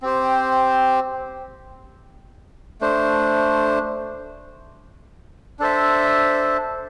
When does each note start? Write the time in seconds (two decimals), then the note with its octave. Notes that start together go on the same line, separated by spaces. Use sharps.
0.02 C4 G4 C5
2.81 A3 D4 C5
5.59 D4 A4 C5 E5